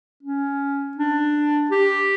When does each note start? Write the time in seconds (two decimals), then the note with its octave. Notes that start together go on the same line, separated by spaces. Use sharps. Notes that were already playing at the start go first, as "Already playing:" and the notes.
0.23 C#4
0.97 D4
1.71 G4